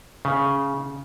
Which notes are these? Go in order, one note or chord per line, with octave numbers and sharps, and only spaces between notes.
C#3